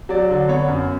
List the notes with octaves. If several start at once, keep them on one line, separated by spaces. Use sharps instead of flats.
F#3 D5
D3
B3 C#5
F#2